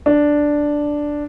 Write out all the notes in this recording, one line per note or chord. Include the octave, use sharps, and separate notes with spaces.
D4